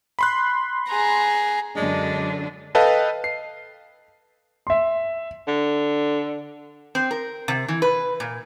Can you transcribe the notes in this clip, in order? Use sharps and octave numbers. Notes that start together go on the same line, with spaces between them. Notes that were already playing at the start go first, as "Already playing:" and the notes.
B5 C6 F#6
G#4 A#5
F#2 D3 G#3 D4
A4 B4 D#5 F5 G5 A5
C7
E5 C6
D3
C4
A#4
C3
E3
B4
A#2